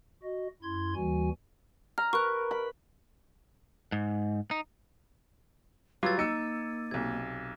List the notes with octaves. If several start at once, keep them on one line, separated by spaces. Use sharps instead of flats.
F#4 D#5
F#2 E4 C6 G#6
D#2 E3 G3 F#4 G#5
A#5 F6
A#4 B4 C#6 F#6
B5
G#2
D#4
F#3 G3 F4 B4 D6 E6 G#6 A6
A#3 D#4 E6 C#7 D#7
B1 C3 G#6